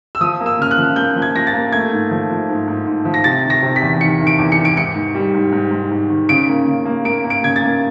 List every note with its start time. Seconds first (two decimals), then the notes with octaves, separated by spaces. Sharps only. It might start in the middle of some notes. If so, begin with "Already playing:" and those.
0.15 E6
0.21 F3 D#6
0.40 A#3
0.46 E6
0.59 C#3 F6
0.71 F#6
0.78 F3
0.96 A#3 G6
1.16 F3
1.22 G#6
1.35 F3 A#6
1.47 A6
1.53 A#3
1.72 A3 G#6
1.92 G#2
2.11 F3
2.30 F3
2.49 G#2
2.68 G#2
2.87 G#2
3.05 F3
3.14 A#6
3.24 C3 A6
3.44 D#3
3.50 A#6
3.63 C3
3.76 B6
3.82 E2
4.01 D#3 C#7
4.19 D#3
4.27 D7
4.39 E2
4.52 C#7
4.58 D#3
4.65 D7
4.77 G#2 C#7
4.95 G#2
5.15 G3
5.34 G#2
5.52 G#2
5.71 G#2
5.91 G#2
6.09 D#3
6.29 C#3 D7
6.48 A#3
6.67 C#3
6.85 A#3
7.05 A#3 D7
7.24 A#3
7.30 D7
7.43 C#3 G#6
7.56 A6
7.62 A#3